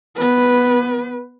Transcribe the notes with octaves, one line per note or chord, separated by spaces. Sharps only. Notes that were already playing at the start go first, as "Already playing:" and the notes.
B3 B4